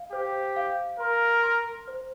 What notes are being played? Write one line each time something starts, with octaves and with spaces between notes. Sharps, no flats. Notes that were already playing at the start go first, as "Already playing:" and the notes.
Already playing: F5
G4 C5
F5
A#4 C6
C6
C5